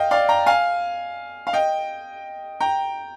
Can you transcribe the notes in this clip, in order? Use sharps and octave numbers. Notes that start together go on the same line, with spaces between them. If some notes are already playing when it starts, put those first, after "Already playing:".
Already playing: D#5 F5 G5
D5 F5
G5 A#5
F5 G#5
F5
D#5 G5
G5 A#5